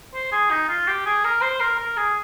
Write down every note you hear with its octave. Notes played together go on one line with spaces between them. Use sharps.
C5
G#4
D#4
F4
G4
G#4
A#4
C5
A#4
A#4
G#4